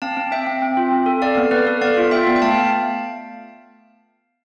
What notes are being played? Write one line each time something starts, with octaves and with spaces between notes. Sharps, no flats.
C4 F5 A5
C4
C4 E5 G5
C4
C4
F4
C4
A4
A4 D5 F5
B3
B3 B4 D5
A4
B3 D5 F5
F4
F4 E5 G5
B3
G5
A3 F5 A5